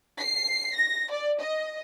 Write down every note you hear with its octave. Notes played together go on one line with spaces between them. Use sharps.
C7
A#6
D5
D#5